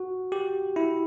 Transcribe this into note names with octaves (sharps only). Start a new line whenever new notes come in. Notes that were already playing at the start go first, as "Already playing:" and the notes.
Already playing: F#4
G4
E4